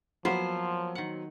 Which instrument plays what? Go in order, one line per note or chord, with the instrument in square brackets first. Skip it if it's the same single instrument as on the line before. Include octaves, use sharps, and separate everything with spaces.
[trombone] F3 [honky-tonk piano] F#3 [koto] A#3 B3 B4 [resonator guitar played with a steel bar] C5
[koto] D#3 F#5